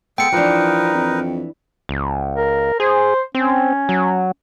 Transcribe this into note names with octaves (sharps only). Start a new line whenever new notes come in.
G#3 B3 A4 G5 C#7
E3 F3 D4 D#4 A#4 B4
F2
C#2
A#4
G#4 C5
C4 C#4
F#3